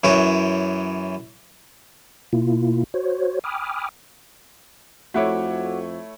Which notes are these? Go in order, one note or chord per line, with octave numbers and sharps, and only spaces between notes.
F#2 E3 C#5
B2 A#3 E4 F4
F#4 C5 C#5
G5 G#5 B5 D6 D#6 F6
F2 A3 E4 F#4 C#5 F#5 D6